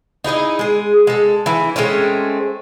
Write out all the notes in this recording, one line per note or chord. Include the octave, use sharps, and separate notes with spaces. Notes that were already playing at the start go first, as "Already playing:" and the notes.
D#4 E4 G#4 D#5
G#3 G#4
G#3 A4
E3 E4
G#3 A3 C4 C#4